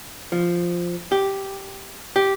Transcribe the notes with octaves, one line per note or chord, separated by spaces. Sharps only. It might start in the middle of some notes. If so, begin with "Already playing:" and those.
F3
G4
G4